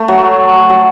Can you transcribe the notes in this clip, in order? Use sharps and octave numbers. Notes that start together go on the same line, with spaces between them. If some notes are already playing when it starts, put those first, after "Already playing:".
Already playing: A3
F#3
F#3